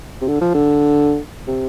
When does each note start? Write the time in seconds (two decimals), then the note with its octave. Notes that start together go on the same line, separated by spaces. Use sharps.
0.21 C3
0.28 D3
0.41 F3
0.54 D3
1.47 C3